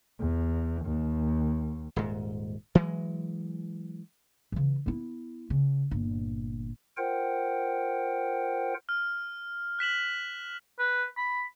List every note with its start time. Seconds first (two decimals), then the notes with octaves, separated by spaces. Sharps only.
0.19 E2
0.85 D#2
1.96 D#1 G#2
2.75 E3 F#3 G#3
4.52 C#3 E3
4.86 B3 E4
5.50 C#3
5.91 G1 A#2
6.97 F4 A#4 C5 F#5 G5
8.89 F6
9.79 F#6 B6 E7 F#7
10.79 B4
11.17 B5